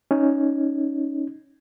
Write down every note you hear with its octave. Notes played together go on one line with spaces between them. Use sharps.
C#4 D#4